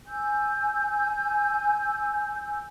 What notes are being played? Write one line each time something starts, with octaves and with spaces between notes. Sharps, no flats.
G#5 E6 G6